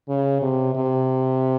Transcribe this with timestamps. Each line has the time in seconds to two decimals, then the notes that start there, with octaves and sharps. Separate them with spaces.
0.09 C#3
0.42 C3
0.75 C3